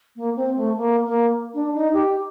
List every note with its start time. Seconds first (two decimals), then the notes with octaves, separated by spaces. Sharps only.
0.16 A#3
0.36 C4
0.56 A3
0.76 A#3
1.05 A#3
1.54 D4
1.74 D#4
1.93 G4